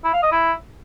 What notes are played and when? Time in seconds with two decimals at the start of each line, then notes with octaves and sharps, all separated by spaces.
0.04 E4
0.13 F5
0.22 D#5
0.32 E4